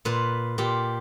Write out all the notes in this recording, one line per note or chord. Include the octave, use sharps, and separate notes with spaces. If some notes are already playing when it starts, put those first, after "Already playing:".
A#2 B4
A#2 G4